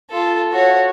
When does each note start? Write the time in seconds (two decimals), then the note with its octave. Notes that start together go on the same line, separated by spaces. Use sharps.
0.11 F4 A4
0.52 F#4 C#5